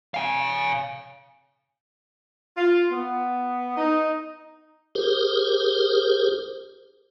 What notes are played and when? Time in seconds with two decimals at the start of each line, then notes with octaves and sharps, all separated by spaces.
0.14 F5 G#5
2.57 F4
2.92 B3
3.77 D#4
4.95 G4 G#4 A#4 C5